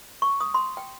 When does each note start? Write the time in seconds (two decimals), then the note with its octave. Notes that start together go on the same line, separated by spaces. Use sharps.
0.22 C#6
0.41 D#6
0.54 C6
0.77 G5